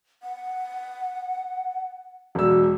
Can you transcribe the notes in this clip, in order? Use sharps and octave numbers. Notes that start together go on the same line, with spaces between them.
F#5
E1 E6